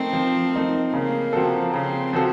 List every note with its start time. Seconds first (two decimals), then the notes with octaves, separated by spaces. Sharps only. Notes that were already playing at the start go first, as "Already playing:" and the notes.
Already playing: F3 A3 C4 D#4 A#4
0.13 F3
0.53 A3 D#4 A#4
0.93 C#3 A#3
1.33 F3 C4 F#4 A4
1.73 C#3 C4
2.13 F3 C4 F#4 A4